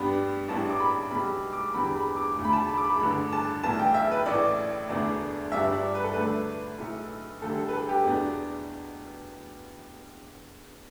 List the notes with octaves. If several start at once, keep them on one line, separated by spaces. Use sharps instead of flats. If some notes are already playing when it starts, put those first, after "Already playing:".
Already playing: G2 G3 B3 D4 B5
A1 A2 G3 B3 D4 A5
D6
B5
B1 B2 G3 B5
D6
E2 D3 G3 B3 B5
B5
D6
E1 D2 D3
B5
A5
B5
D6
B5
A1 G2 D3 B5
A5
B1 A2 E3 B3 D4 A5
G5
E5
B4
A1 A2 E3 A3 D5
E1 D2 D3 B3 D4
G1 G2 G3 D4 E5
D5
B4
A4
D2 D3 A3 D4 B4
B1 A2 A3
D2 D3 G3 A4
A4
B4
A4
G4
E2 B2 B3 D4